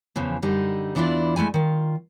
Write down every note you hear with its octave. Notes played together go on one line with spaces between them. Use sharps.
E2 C#3 E3 F3
F#2 D3 G3 D#4
E2 E3 D4 E4 F4 D5
G#3 A3 E4 G#5
D#3 F4